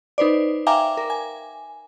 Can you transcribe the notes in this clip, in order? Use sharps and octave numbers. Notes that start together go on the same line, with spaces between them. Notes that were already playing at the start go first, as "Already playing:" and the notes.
D#4 B4 C5 D5
E5 F5 G5 G#5 A#5 D6
A#4
G#5